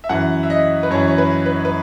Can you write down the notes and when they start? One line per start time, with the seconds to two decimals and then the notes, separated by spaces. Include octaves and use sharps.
0.04 E5
0.09 F#2 E3 F#5
0.43 E5
0.50 D#5
0.83 B4
0.90 F#2 E3 C#5
1.08 C#5
1.18 B4
1.46 B4
1.65 B4